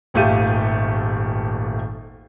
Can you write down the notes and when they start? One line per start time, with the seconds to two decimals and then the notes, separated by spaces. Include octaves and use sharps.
0.14 D#1 G#1 A3 F4 G4 D#7